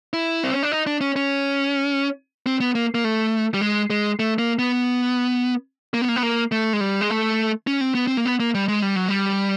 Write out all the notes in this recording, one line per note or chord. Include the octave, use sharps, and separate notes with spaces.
E4
C4
C#4
D4
D#4
D4
C#4
C#4
C4
B3
A#3
A#3
A3
G3
G#3
G#3
A3
A#3
B3
A#3
B3
A#3
B3
A#3
A3
G#3
G3
G#3
A3
C#4
C4
B3
C4
A#3
B3
A#3
G3
G#3
G3
F#3
G3